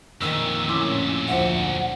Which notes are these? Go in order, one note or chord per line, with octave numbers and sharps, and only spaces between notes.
F2 A#2 D#3 E6
A2 C#4 E4 C6 D6
D2 F3 C5 E5 F#5